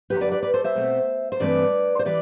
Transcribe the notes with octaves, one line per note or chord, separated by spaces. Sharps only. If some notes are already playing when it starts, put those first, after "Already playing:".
F#2 D3 F#3 G4 B4
B4 D5
B4 D5
B4 D5
A4 C5
C5 E5
B2 A3 C4
C5
G2 E3 A3 C4 B4 D5
C5
E3 G3 B4 D5